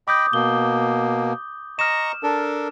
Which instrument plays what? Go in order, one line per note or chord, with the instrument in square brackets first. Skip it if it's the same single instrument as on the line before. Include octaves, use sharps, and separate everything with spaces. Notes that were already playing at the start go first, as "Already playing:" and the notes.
[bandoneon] D#5 G5 B5 [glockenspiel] D6 D#6 G6
[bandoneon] B2 A#3 [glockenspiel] G7
[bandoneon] D#5 A#5 C#6 [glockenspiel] F6 E7
[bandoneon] D4 A4 A#4